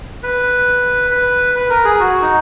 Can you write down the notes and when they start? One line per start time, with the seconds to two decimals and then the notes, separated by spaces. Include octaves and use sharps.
0.23 B4
1.11 B4
1.55 B4
1.70 A#4
1.84 G#4
2.00 F#4
2.21 D#4